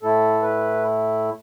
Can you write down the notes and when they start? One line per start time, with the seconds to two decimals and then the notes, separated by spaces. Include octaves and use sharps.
0.02 A2 A3 E4 A4
0.42 B4